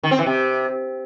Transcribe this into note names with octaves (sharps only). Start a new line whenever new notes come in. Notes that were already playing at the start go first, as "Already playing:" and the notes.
D#3
C4
E3
C3